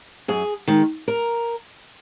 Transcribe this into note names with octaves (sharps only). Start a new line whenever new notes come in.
F#2 G#4
D#3 G#3
A#4